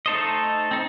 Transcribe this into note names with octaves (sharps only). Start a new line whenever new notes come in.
A3 D#4 A4 C5 D#5
C4 D#4